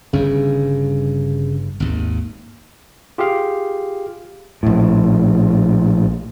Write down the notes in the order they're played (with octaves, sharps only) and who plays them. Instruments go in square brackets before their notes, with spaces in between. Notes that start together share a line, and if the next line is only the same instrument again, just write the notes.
[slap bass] G1 G2 [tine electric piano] C#3
[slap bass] G#1 D#2
[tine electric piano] F4 G4 G#4 F5
[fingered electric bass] A#1 A2